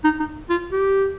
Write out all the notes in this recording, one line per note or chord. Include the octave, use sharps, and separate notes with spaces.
D#4
D#4
F4
G4